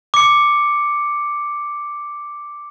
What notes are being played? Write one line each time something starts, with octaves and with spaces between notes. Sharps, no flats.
D6 C#7